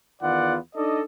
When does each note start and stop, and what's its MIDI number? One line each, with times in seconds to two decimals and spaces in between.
0.22 0.57 40
0.22 0.57 51
0.22 0.57 59
0.22 0.57 65
0.22 0.57 74
0.22 0.57 78
0.76 1.02 62
0.76 1.02 63
0.76 1.02 69
0.76 1.02 74
0.76 1.02 75